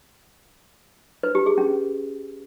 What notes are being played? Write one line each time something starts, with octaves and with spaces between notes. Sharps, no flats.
B4
G4
G#4
C#4